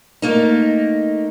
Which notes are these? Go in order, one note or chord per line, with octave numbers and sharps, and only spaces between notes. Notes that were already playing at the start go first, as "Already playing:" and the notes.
A3 A#3 D#4